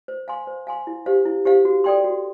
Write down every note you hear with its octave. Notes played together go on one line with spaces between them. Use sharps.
C5
F5 G#5 C6
C5
F5 G#5 C6
E4
G4 C5 F5
E4
G4 C5 F5
F#4
A4 D5 G5 C6
F#4